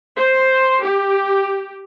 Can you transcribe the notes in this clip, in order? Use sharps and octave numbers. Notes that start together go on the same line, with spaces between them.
C5
G4